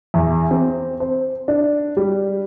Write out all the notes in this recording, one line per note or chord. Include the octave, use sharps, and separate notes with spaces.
E2
C4
C5
D4
G3